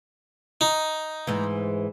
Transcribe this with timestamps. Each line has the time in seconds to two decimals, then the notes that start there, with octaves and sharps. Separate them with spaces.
0.61 D#4
1.27 G#2 E3